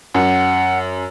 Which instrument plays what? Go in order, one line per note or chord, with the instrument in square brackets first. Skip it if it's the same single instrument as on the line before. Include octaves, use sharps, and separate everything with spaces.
[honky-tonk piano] F#2 [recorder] F#5